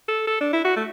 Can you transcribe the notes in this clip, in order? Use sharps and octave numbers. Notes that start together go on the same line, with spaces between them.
A4
A4
D4
E4
F#4
A3